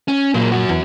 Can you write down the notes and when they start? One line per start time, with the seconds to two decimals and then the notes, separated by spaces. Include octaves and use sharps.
0.08 C#4
0.34 A#2 F#3 A#3
0.52 F#2 F#4
0.69 E2